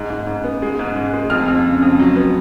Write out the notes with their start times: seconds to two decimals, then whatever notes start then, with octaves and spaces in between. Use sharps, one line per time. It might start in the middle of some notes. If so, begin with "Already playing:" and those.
Already playing: G#2
0.10 G#2
0.27 G#2
0.44 B3
0.62 G#3
0.79 G#2
0.96 G#2
1.13 G#3
1.30 F2 F6
1.48 F2
1.65 C#3
1.83 F2
1.99 F#3
2.16 B3